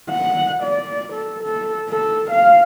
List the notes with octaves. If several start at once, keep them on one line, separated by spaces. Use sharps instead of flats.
F#5
D5
A4
A4
A4
F5